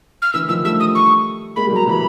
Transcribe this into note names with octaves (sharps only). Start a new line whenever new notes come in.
F6
D3 E3 E6
D#3 F3 E6
G3 A3 E6
D#6
C#6
G#3 A#3 B5
G3
F#3 G#3 A#5
E3 F#3 B5